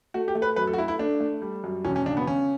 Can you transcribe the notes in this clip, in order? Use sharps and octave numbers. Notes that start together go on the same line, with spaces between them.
A3 F#4
G4
A3
B4
F#2 B4
A4
F#4
A3 E4
E4
A3 D4
A3
G3
F#2
E1 C#4
C#4
C#3 D4
B3
C#3 C#4